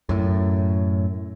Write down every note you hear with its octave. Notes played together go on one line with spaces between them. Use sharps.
F#2 A2